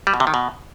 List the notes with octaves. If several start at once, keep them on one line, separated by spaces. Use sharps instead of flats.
G3
B2
C3
D#3
B2